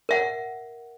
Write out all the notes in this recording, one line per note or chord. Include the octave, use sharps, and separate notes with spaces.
A#4 E5 F#5